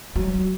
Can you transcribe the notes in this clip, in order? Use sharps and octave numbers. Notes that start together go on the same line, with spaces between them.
F#3